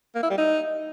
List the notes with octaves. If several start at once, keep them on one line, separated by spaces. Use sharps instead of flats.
A#3
E4
G3
D#4